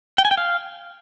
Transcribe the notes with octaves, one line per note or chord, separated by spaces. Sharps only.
G5
G#5
G5
F5